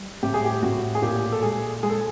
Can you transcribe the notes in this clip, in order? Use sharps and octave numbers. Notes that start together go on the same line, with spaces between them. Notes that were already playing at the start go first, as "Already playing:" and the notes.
Already playing: G3
A2 G4
G#4
G4
A2 F#4
G#4
A#2 G4
A4
G#3 G#4
G#3 G#4
A4